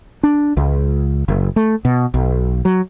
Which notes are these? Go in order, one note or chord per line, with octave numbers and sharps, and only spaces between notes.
D4
C#2
F#1
A3
B2
B1
F#3